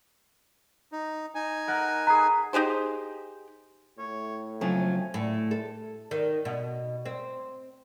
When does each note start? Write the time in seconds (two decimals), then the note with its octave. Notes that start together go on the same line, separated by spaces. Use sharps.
0.92 D#4
1.35 D#4 G#5
1.68 A#4 F#5 A5
2.07 G#4 B4 A#5
2.53 D#4 G4 G#4 C5
3.99 A2 C#5
4.61 F2 C#3 F3 F#3 A3 G#5
5.14 A2
5.51 A4
6.11 D#3
6.45 B2
7.05 C4